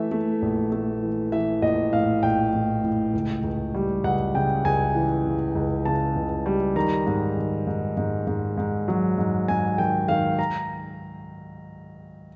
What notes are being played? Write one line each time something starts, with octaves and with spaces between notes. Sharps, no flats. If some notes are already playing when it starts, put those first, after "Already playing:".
Already playing: E3 A3 E5
A3
A#1
A3
E3
E3 E5
A#1 D#5
A2 F5
A#1 G5
A2
A2
C#2
C#2
G3
C#2 F#5
C#3 G5
C#2 G#5
E3
C#3
C#2
C#3 A5
C#2
G3
D#3 A#5
G#2
D#3
G#2
G#2
G#2
G#2
F#3
G#2
G#2 G#5
D#3 G5
D#3 F5
A#5